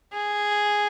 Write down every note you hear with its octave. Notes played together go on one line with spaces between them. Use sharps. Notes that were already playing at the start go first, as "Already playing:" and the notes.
G#4